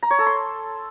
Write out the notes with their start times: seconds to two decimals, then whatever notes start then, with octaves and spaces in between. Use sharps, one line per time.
0.03 A#5
0.11 C#5
0.19 A4
0.27 C6